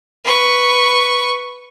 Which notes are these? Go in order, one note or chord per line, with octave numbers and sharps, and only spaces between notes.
B4 C#6